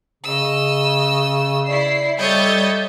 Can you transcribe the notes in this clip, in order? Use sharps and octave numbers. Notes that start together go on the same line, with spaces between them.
C#3 D#5 E6
E4 D5 C7
G3 A4 C#5 D#5 E5 G6 A6